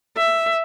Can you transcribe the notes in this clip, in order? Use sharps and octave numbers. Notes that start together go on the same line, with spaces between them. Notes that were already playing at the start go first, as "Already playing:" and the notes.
E5